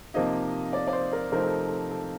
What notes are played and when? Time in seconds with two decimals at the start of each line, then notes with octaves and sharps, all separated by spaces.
0.14 C3 F3 A#3 D#4 D#5
0.73 D5
0.87 D5
0.93 C5
1.13 A#4
1.32 C3 F3 A3 C4 D#4 A#4
1.44 A4
1.67 A4
1.91 A4